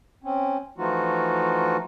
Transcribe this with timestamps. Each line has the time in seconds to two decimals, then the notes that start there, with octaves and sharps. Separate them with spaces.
0.24 C4 C#4
0.78 E3 F3 A3 D#4 F4 F#4